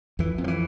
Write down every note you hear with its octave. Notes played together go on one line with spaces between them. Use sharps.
F2 E3
F2
F3
E3